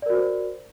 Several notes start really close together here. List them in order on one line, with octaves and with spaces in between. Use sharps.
D5 A#4 F#4 C5